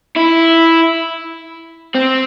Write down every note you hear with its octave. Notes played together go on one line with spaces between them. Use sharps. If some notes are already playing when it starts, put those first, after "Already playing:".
E4
C4